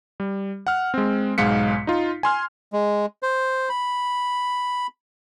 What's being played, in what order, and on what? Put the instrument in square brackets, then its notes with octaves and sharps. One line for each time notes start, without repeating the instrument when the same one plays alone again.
[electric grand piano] G3
F#5 F6
G#3 C4
B1 G#2 G#3 F5 B6 C#7
D#4 F4
G#5 C6 F6
[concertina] G#3
C5
B5